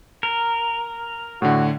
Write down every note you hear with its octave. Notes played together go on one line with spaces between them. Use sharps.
A#4
A2 D3 F#4